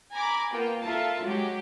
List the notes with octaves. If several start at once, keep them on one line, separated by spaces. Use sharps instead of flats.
G#5 A#5 B5 D6
A#3 B3 F4 G5
F4 A4 A#4 E5 A5
F#3 G#3 G4